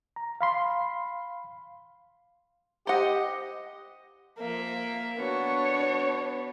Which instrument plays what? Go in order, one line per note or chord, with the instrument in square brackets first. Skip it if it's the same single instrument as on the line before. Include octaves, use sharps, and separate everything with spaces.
[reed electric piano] A#5
F5 B5 C6
[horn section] G4 D#5 [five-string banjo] C5 F#5
[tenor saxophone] F3 [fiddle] A#3 E5
[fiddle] B3 [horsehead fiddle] D4 C#5 [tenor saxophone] F#4